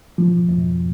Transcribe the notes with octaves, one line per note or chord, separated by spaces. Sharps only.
F3
F2